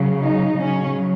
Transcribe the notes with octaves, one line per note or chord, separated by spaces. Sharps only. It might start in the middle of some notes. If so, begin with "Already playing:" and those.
Already playing: C#3 F#3
D#4
C#3 F#3 C#4